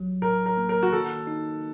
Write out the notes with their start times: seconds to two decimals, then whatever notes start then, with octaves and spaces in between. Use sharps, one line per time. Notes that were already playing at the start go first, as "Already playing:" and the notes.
Already playing: A1 F#3
0.22 A2 A#4
0.46 A#4
0.57 A#3
0.69 A#4
0.83 F#4
0.92 D#3 A4
1.27 D#4